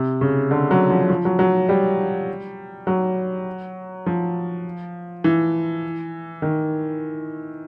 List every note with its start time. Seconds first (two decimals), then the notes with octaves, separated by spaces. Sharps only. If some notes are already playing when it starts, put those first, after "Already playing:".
Already playing: C3
0.21 C#3
0.51 D3
0.71 F#3
0.90 F3
1.10 F3
1.25 F#3
1.39 F#3
1.69 G3
2.87 F#3
4.06 F3
5.24 E3
6.42 D#3